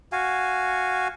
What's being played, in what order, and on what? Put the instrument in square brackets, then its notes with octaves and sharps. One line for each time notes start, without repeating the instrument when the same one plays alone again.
[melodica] F#4 F5 G#5